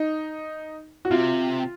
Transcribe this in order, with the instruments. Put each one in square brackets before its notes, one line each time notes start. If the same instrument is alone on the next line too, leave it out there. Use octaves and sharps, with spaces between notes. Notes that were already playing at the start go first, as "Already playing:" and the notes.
Already playing: [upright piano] D#4
F#4
[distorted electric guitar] C3 [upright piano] F4